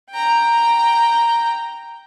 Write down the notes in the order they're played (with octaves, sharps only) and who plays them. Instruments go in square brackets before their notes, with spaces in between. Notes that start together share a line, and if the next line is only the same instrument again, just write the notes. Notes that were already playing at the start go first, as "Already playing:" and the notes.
[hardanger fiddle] G5 A#5